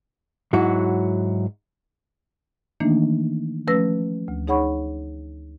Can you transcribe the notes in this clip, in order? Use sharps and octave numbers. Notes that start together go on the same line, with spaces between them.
G#2 F#3 E4 F#4
D#3 E3 A3 A#3 D4 D#4
F3 A3 C#4 B4 E6 A#6
D2
D#4 G#4 C#5 F#5 B5 C#6